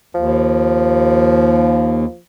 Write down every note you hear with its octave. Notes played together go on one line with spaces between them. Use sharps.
D#2 F3